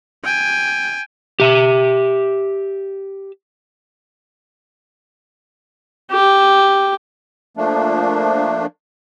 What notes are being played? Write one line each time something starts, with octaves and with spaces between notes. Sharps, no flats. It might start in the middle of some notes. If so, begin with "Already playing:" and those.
G5 G#5
G4 E5
G4
F3 A3 A#3 D4